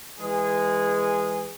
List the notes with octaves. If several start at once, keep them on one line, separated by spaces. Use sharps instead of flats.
E3 G#3 G#4